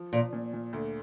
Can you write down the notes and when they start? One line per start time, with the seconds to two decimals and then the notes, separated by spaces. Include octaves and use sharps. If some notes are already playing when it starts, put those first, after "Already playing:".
Already playing: F3
0.13 A#2 F3
0.33 A#2
0.53 A#2
0.73 D2